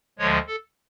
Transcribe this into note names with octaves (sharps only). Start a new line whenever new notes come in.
D2 D3 F3 G#3 C#5
A4